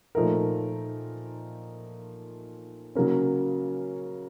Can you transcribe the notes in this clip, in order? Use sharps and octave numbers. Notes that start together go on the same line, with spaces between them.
A#2 F3 A3 D#4 A#4
C#3 F#3 A#3 C#4